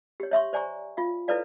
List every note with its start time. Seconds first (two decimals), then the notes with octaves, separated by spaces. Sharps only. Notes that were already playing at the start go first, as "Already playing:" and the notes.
0.20 G4 C#5
0.31 C#5 E5 C6 C#6
0.53 C5 D5 G#5 A#5 C#6
0.97 F4 F5
1.28 E4 A4 B4 C#5 D5 F5